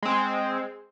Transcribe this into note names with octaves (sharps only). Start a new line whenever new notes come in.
G#3 C4